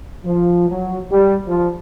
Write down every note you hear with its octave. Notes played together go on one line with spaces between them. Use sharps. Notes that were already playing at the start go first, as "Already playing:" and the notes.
F3
F#3
G3
F3